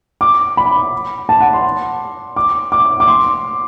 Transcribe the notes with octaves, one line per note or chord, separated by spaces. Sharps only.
D6
B5
A5
F#5
C6
D6
D6
D6
C6